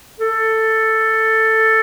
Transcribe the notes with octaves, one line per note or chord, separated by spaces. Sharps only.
A4